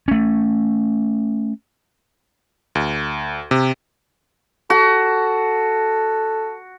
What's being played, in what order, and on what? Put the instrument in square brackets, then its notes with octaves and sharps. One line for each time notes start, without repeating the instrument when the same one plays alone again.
[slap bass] A3 C#4
[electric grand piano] D2
C3
[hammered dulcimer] F#4 [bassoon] A4